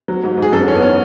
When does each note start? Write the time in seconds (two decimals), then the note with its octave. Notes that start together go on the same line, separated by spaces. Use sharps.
0.08 F#3
0.24 G#2
0.37 G#2
0.42 G#4
0.52 F#2 A4
0.68 E3 C#4
0.75 B3
0.82 C#4